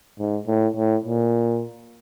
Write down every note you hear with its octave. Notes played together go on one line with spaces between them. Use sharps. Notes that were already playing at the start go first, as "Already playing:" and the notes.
G#2
A2
A2
A#2